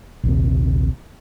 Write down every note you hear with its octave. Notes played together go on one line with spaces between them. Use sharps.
A#1 D#2 C3